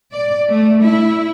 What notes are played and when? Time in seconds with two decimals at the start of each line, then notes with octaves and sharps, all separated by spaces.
0.12 D5
0.48 A3
0.81 E4